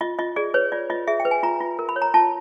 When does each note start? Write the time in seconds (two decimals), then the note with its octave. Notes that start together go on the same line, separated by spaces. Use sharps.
0.01 F4 D#5
0.19 F4 D#5
0.36 G#4 D5
0.54 B4 C#5
0.72 F4 D5
0.90 F4 D#5
1.08 G#4 E5
1.20 G5
1.25 B4
1.31 G#5
1.43 F4 A#5
1.60 F4
1.79 A#4
1.89 B5
1.96 C#5
2.02 A#5
2.14 F4 A5